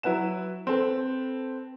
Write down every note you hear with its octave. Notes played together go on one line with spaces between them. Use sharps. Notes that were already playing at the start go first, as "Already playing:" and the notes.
F#3 E4 B4 F#5 E7
C4 A4 B4